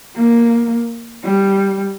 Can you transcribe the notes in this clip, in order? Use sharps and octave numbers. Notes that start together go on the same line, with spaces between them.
A#3
G3